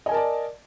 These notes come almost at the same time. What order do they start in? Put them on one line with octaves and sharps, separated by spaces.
D#5 G#5 A#4 A5 D5